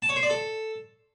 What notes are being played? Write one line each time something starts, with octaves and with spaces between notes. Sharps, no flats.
A5
C#5
C5
D5
A4